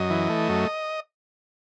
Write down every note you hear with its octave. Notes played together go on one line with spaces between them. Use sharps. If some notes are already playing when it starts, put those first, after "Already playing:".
Already playing: F#2 D#5
E3
A3
F#2